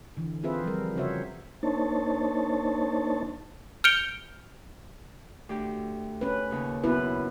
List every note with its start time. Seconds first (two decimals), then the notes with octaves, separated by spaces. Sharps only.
0.17 D3 E3
0.43 C4 F4 G#4 B4 C5 E5
0.64 F3 G3 A#4
0.96 C#3 C#4 F#4 C5 C#5 E5
1.63 A#3 D4 D#4 C5 C#5 A5
3.84 F6 G6 C#7 D7 F7 G7
5.49 D2 G4
6.21 C#4 B4
6.51 D#2 C#3
6.84 F#2 B3 E4 B4